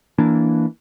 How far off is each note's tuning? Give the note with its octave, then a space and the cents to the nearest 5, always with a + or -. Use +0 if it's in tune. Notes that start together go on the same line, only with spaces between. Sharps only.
E3 +0 A#3 +0 D4 -15